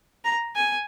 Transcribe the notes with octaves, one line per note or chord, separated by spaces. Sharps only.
A#5
G#5